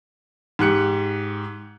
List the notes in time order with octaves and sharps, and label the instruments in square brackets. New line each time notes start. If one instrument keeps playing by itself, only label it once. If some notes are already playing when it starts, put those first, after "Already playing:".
[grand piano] G#2 G4 F#6 C#7